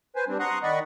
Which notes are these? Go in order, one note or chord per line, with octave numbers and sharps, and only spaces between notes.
B4 C5 G#5
G3 C4 D4
F#5 A#5 C6 C#6 D#6 F#6
D#3 D5 D#5 F#5 B5 C#6